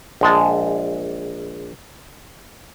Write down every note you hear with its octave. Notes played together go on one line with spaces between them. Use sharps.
A#1 G#3 A5